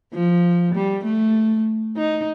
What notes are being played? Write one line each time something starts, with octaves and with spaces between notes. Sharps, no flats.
F3
G3
A3
D#4